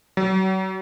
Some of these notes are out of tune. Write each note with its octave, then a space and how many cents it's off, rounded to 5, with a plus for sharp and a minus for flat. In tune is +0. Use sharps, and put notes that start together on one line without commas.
F#3 +40